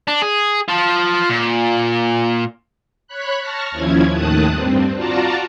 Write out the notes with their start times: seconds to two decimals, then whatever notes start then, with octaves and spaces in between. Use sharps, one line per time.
0.08 D4
0.22 G#4
0.68 F4 A5
1.30 A#2
3.08 C#5 B5 F#6
3.42 A5 C#6 F6 A#6
3.71 D#2 F3 C#4 E4 G#6
4.11 D#2 A2 D#3 A5 D#6 F#6
4.49 G2 C4
4.96 F4 F#4 D5 A5 A#5